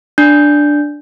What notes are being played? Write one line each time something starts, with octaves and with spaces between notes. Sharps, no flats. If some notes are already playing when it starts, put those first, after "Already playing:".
D4 G6